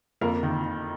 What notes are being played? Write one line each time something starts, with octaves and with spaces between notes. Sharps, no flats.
F2 A#3 A#4
D#3